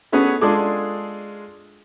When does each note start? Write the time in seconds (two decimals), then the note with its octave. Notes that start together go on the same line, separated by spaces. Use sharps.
0.12 A3 B3 C#4 F#4 G#4 B4
0.42 G#3 D4 F4 G#4 A4 D6